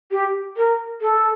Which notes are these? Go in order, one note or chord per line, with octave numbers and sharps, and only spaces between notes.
G4
A#4
A4